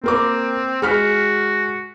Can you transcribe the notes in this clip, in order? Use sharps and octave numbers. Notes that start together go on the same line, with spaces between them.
A#3 C4 A#4 D6
G#3 F#4 F6 B6